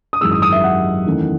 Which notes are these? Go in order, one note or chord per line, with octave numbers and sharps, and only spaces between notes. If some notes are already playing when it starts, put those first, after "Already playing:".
D#6
G#1 F#2 E3 G#3 E6
D#6
D#6
E5
F#5
E2 D#3 A3 C#4 E4